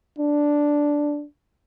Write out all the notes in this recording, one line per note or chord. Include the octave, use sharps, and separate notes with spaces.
D4